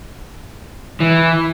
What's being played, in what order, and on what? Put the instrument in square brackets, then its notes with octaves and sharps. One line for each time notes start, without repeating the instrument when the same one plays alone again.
[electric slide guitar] E3